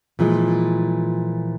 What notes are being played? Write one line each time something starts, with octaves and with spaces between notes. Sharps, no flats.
A#2 E3 F3 G#3